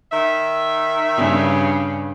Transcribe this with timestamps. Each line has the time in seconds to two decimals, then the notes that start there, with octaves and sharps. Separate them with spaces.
0.12 D#3 E5
1.16 G2 C#3 G3